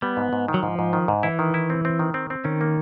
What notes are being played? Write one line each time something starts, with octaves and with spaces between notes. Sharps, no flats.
G3 B3
G#2
G#2
D#3
F#3
G#2 F3
G#2
D#3
G#2
E3 E4
D#3
E4
C4
C4
D#3
C4
C4
D#3 C#4
A#3